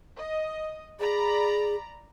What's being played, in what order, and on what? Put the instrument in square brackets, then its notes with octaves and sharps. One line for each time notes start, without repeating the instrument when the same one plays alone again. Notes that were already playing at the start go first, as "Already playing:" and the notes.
[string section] D#5
[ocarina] G#4 [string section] D5 A#5 B5